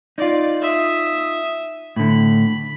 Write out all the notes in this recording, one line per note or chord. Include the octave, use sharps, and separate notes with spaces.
D#4 F4 D5
E5 D#6
A2 D3 B5